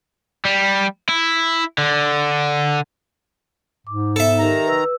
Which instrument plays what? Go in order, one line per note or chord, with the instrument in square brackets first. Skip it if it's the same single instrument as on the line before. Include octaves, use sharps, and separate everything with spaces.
[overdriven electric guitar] G3
E4
D3
[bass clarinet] G#2 [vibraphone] D6
[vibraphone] B3 D#4 [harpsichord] A4 E5
[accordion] D#3 A#5 [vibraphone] G4 A#4
[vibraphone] B4 E6